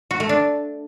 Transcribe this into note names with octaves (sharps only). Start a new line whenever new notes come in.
F#4
A3
D4